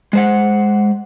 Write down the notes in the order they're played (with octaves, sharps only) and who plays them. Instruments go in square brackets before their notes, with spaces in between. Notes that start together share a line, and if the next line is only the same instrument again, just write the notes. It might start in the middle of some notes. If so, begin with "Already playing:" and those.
[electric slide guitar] G#3 C5 F#5